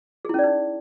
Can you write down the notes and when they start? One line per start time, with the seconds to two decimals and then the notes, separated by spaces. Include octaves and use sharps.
0.25 G#4
0.29 E4
0.34 C#4
0.39 D5
0.43 D#4